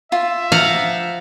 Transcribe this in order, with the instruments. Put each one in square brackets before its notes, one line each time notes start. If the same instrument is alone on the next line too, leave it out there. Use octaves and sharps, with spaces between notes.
[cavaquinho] F4 [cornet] E5
[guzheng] F3 [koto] F5 F#5 A#5